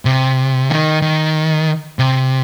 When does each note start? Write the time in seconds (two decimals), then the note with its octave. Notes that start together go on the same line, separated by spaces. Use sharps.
0.05 C3
0.70 D#3
1.02 D#3
1.99 C3